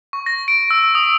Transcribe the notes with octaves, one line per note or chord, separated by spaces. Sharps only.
C#6
A#6
D7
E6
D#6